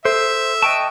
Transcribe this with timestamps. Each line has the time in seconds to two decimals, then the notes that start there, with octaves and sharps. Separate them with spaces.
0.05 A4 C5 E5
0.62 D#5 G5 A5 C#6 F#6